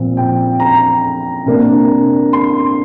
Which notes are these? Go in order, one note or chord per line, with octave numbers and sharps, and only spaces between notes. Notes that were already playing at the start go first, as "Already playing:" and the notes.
Already playing: A#2 F3 C4
G5
A#5
C3 A#3 D4
C6